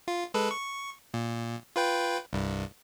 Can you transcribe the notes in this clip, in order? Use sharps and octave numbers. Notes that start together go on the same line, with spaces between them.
F4
G#3 A4 B4
C#6
A#2
F4 B4 G5
C2 G2